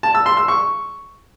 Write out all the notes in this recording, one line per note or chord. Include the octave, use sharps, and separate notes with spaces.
A5
E6
C6
E6
C#6